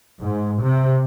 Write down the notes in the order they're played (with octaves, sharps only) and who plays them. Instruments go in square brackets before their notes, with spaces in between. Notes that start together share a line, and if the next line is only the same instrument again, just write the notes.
[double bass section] G#2
C3